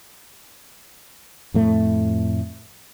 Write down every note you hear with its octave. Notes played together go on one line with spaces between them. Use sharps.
F2 A2 A3